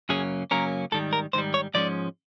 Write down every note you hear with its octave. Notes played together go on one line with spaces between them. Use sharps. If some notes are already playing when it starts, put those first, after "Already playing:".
F#2 C#3 F#3 A#3 C#4 G#4
F#2 C#3 F#3 A#3 C#4 A#4
G#2 D#3 G3 A4
A#4
G#2 D#3 G3 C5
C#5
G#2 F3 G#3 C#4 D5